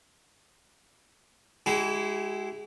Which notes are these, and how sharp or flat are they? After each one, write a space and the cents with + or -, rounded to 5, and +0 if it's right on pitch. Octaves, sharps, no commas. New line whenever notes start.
G#3 +0 E4 +0 G4 -45